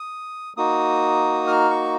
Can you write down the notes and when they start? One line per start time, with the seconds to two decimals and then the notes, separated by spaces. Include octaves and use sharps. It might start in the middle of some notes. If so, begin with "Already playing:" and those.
Already playing: D#6
0.57 A#3 D#4 F#4 D#6
1.47 F6
1.70 C#6